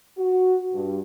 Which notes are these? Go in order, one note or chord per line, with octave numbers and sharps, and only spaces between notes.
F#4
G2